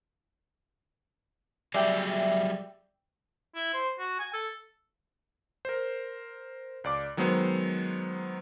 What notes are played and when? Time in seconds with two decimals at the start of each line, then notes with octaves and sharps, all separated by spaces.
1.74 F#3 G3 G#4 D5 E5 G5
3.55 E4
3.73 C5
3.99 F#4
4.19 G#5
4.34 A4
5.65 A#4 C5
6.84 C#2 D5 D6
7.17 D#3 F#3 G#3 B3 C5